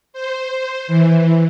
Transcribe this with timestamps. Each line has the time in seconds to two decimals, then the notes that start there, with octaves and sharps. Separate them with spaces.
0.13 C5
0.87 E3